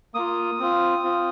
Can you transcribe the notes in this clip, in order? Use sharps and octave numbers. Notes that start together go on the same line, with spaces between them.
A#3 F4 D#6
C4 F4
C4 F4